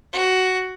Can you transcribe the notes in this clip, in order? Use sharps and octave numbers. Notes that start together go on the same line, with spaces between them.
F#4